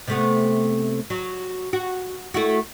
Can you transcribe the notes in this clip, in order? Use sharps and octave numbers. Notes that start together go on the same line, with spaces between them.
C3 A3 B3
F#3
F#4
A3 E4 F#4